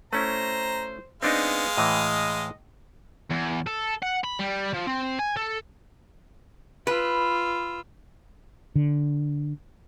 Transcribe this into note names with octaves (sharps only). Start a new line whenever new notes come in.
A3 C#4 E4 C5 A#5
G#3 B3 C4 D4 D#4 F5
A2 E3 D#5
E2
A4
F#5
B5
G3
F3
C4
G#5
A4
F4 B4 E6
D3